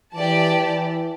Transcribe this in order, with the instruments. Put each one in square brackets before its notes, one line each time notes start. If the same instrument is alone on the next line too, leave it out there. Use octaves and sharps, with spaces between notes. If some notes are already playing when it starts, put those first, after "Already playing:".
[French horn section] E3 [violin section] G4 D5 A5
[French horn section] E3